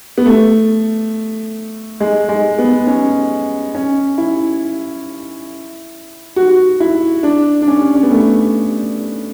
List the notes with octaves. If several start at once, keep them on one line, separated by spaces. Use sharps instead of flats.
B3
A3
G#3
G#3
B3
C#4
C#4
E4
F#4
E4
D4
D4
C#4
C#4
B3
A3